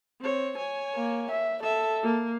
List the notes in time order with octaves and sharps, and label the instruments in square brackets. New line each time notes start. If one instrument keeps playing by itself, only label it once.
[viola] C4 C#5
C#5 G#5
[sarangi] A#3
E5
[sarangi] A4 [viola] E5
[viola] A#3